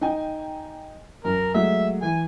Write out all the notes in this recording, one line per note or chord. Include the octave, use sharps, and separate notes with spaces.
D#4 G5 G#5
F#2 A#4
F#3 G#3 A3 E5
E3 G#5